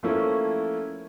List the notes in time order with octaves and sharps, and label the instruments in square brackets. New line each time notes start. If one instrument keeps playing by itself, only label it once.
[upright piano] F3 A3 A#3 C#4 E4